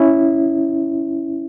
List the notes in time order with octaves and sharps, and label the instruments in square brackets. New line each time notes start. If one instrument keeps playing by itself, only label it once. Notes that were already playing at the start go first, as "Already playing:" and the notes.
Already playing: [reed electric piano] C#4 E4